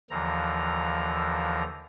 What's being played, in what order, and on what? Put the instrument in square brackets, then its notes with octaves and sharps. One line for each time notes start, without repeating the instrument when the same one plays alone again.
[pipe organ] D#2 D3 E3 F3 A#5